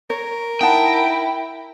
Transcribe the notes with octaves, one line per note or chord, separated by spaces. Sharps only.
A#4 C#5
D#4 E4 F#5 G5 A5